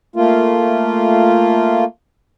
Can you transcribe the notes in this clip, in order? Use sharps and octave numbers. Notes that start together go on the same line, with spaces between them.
A3 A#3 F4